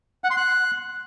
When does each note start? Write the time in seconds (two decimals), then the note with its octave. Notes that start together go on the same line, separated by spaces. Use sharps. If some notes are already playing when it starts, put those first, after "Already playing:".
0.24 F#5
0.30 C6
0.37 F#6